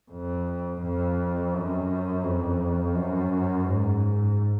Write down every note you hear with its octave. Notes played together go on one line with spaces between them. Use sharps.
F2
F2
F#2
F2
F#2
G#2